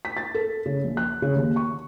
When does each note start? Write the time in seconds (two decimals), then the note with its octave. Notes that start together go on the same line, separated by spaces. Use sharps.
0.05 B6
0.17 A6
0.35 A4
0.66 C#3
0.84 A#1
0.97 F#6
1.22 C#3
1.36 D#2
1.56 C#6